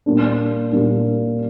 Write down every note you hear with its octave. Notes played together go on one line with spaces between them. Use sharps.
A#2 G3 A#3 D4
A#2 G3 A#3 D4